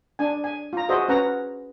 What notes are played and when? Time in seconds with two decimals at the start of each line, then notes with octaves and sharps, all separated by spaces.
0.19 D4 G#5
0.44 G#5
0.73 F4 A#5
0.89 F#4 G#4 C5 D#5 E5
1.09 C#4 B4 F#5 A#5